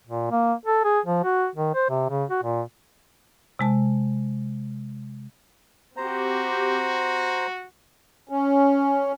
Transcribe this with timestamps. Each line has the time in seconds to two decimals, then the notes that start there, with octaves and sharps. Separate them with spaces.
0.07 A#2
0.31 A#3
0.65 A4
0.84 G#4
1.05 F3
1.24 F#4
1.55 D#3
1.75 C5
1.89 C3
2.09 C#3
2.30 F#4
2.43 A#2
3.59 C3 G#3 A5
5.97 C4 F#4 G4 C5 A#5
8.29 C#4